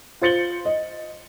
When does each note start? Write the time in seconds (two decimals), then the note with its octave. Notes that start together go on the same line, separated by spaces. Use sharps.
0.21 F4 C5 A6 C#7 F#7 G7
0.65 D#5